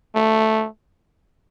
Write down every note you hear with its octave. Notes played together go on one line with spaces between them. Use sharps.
A3